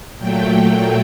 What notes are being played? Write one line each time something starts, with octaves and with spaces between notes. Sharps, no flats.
A#2 F#3 A3 G5